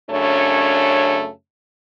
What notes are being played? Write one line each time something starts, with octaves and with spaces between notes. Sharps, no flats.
F#2 C#3 A3 D4 C#5